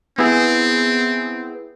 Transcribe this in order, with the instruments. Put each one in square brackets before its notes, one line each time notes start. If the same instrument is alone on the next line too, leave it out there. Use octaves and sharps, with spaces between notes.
[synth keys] B3 E4 G#4 [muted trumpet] C4